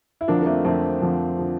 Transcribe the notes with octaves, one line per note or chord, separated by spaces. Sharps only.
E4
F2 D3 F3 A#3 D4
A#3
A3 C4
F2 D3 F3 A3 C4
F2 D3 F3
D3 F3